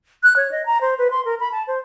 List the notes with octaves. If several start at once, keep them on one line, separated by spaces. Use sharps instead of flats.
F#6
C#5
D#5
A#5
C5
B4
C6
A#4
B5
A5
C5